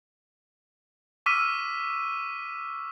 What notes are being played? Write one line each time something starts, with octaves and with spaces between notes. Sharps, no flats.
C#6 D6 E6 F6 B6 D#7